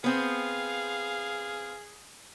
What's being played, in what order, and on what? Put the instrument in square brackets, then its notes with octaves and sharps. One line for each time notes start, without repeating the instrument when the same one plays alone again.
[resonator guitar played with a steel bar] B3 C4 [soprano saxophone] G#4 [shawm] F5